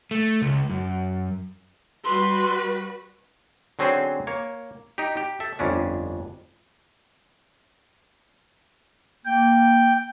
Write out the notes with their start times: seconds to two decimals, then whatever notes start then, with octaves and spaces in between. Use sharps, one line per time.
0.11 A3
0.42 C#2
0.70 F#2
2.04 G3 F#4 B4 C6
3.79 D3 F#3 C4 C#4 G#4 C5
4.27 A#3 C#5
4.98 D#4 G4
5.17 G4
5.40 A4 E5
5.59 G1 F2 C#4 D4
9.26 A#3 G5